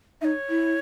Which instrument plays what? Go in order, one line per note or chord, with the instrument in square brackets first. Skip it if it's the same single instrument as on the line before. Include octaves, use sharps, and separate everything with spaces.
[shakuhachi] D#4 [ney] C#5 E5
[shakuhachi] E4